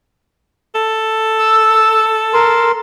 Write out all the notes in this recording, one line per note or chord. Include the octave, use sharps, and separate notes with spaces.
A4
E6
A#4 C6